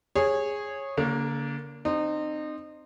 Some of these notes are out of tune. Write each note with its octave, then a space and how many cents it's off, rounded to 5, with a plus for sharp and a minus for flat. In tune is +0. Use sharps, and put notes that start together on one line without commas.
G#4 -5 C#5 -15
D3 -40 A#3 +0
C4 +0 D#4 -30